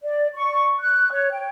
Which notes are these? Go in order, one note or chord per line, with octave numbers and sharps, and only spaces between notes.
D5
C#6
F#6
C#5
G5